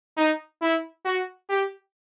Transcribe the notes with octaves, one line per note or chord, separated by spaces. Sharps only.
D#4
E4
F#4
G4